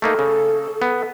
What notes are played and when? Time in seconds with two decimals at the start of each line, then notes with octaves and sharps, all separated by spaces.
0.02 A3 A#3 D#4 A4
0.19 C#3
0.82 B3